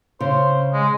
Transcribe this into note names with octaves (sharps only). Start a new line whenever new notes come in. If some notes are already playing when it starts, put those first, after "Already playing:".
C#3 C5
G#3